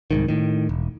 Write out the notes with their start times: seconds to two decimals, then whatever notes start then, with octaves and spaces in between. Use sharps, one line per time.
0.11 C2 G#2 D#3
0.28 A2 D#3
0.69 E1